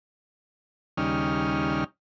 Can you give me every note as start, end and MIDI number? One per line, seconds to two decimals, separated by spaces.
0.97 1.84 39
0.97 1.84 49
0.97 1.84 55
0.97 1.84 61
0.97 1.84 63
0.97 1.84 89